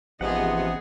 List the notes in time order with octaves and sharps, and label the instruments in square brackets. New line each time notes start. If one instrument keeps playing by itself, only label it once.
[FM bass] A1 [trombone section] G#2 C3 F3 [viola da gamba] B3 G#4 D#5 [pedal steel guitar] F#5